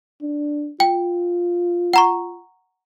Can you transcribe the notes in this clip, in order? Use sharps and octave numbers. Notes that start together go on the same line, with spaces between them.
D4
F4 G5
F#5 A#5 C#6